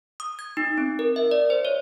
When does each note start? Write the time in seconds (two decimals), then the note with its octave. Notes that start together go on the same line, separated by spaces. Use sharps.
0.20 D#6
0.39 G#6
0.57 D#4
0.78 C4
0.99 A#4
1.16 E5
1.31 D5
1.50 C5
1.65 C#5